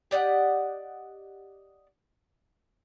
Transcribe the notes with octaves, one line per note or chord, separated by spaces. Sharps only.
G4 D5 D#5 F#5